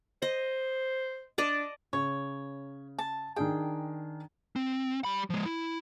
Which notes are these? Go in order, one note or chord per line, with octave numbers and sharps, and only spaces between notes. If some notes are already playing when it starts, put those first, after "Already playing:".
C5 D#5
D4 D5 D#5 A5
C#3 C#5
A5
D#3 D4 G#4 G5
C4
G3 B5
F3 G#3
E4